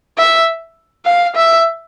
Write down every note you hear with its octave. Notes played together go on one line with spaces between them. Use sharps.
E5
F5
E5